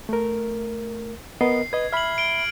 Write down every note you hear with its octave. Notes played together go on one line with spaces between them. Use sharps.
A3 A#4
B3 A#4 D#5 C7
B4 D#5 G#6
E5 B5 F6 F#7
D7 G7